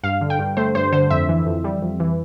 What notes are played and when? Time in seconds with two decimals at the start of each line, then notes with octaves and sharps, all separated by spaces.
0.03 G2 F5
0.21 D3
0.30 G5
0.39 G2
0.57 A3 C5
0.75 G2 C5
0.92 D3 C5
1.10 F2 E5
1.29 E3
1.47 F2
1.64 G3
1.82 F2
2.00 E3